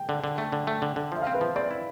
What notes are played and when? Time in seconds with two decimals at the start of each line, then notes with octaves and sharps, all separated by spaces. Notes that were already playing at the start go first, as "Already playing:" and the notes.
Already playing: G5
0.09 D3
0.24 D3
0.38 A3
0.52 D3
0.67 A3
0.82 D3
0.96 D3
1.12 F3 E5
1.22 C4 F5
1.34 B4
1.41 F3
1.56 C4 D5
1.71 E4